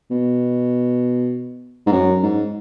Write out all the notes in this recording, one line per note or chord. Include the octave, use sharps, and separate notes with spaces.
B2
G#2
F#2
G#2